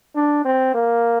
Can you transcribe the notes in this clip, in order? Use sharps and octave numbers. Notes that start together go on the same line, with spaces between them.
D4
C4
A#3